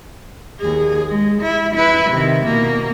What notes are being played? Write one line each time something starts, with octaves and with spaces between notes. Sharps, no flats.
D#2 G#4
G#3
E4
E4 B4
C3 D#3
B2 A#3